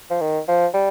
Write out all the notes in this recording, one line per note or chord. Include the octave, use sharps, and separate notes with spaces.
F3
D#3
F3
G3